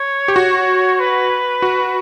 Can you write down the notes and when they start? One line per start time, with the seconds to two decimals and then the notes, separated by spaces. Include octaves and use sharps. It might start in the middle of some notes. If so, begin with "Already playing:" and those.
Already playing: C#5
0.28 G4
0.36 F#4
1.00 B4
1.62 F#4